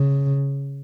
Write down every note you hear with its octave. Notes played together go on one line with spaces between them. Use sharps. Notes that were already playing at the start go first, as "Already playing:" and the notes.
Already playing: C#3